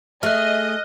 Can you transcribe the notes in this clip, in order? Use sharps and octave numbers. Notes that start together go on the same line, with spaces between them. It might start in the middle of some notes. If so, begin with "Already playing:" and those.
A3 G#4 D#5 E5 F6 F#6